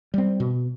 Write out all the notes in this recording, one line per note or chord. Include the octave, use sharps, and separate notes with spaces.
G3 C4
B2